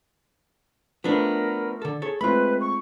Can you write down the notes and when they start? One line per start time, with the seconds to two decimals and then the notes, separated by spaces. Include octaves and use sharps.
1.04 F3 A3 B3 D4 A#4 B4
1.82 D3 A4
2.02 G#4 A4 C#5
2.21 G#3 A3 C4 F4 B4 B5
2.61 C#6